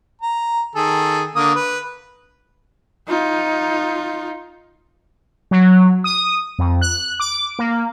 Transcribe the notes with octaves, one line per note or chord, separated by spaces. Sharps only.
A#5
D#3 G#4 A4
D3 A#3 D#6
B4
D#4 F4
F#3
D#6
F2
F#6
D6
A#3